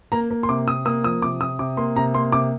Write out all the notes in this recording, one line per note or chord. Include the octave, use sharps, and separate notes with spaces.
A#3 A#5
A#3
C6
C3 D6
C3 D#6
A#3 D#6
F3 D#6
C3 D6
C3 D#6
C3 D6
A#3 C6
C3 A#5
A#3 C6
C3 D6